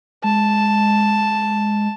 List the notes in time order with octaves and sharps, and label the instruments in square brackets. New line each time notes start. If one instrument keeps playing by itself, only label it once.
[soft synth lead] G#3 [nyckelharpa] A5